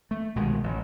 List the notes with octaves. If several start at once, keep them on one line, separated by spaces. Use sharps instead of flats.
A3
C2 B2 D#3 G#3
A1